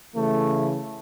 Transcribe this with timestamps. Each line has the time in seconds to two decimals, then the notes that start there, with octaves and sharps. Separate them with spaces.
0.14 C#3 E3 A3